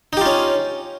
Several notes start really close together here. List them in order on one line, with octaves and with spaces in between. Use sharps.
D#4 G4 F4 C#4